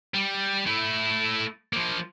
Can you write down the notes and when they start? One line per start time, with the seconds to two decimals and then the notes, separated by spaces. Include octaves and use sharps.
0.14 G3
0.66 A3 E4
1.73 F3 A#3